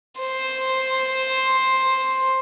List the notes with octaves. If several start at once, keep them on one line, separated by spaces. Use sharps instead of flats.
C5